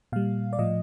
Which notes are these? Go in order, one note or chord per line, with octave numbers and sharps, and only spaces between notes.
A#2 G3 F5
D5
A2 F3 D#5